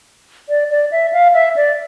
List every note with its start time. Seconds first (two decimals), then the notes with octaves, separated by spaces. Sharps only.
0.49 D5
0.70 D5
0.91 E5
1.13 F5
1.34 E5
1.56 D5